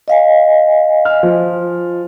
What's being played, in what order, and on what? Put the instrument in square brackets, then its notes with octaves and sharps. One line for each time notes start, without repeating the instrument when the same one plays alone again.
[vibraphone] D#5 F5 G#5
[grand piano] F6
F3